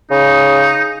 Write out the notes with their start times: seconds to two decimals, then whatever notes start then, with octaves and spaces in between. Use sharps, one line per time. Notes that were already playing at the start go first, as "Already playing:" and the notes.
0.11 C#3 D#4